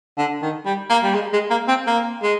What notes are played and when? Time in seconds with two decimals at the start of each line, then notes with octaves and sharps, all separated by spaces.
0.18 D3
0.42 D#3
0.66 G3
0.90 A#3
1.04 G3
1.14 G#3
1.33 G#3
1.50 A#3
1.68 C4
1.87 A#3
2.23 G#3